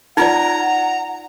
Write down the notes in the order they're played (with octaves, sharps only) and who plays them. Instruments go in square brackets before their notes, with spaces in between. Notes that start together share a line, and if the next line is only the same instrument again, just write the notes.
[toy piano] D#4 F4 D5 [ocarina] F#5 [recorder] A#5